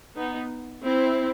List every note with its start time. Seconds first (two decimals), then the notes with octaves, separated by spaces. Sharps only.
0.15 B3 D#4
0.85 C4 E4